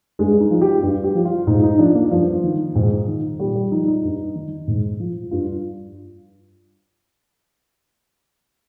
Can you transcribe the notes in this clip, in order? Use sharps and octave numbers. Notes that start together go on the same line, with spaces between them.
G2 G#3
D#4
F3
G4
G2
G4
F3
F4
G#2 D#4
D#4
F3 D4
A#3
G2 F3
D#3
G#2
D#3
A#2 G3
G3
F3 D#4
D#4
G2
D#3
G#2
F3
G2 F4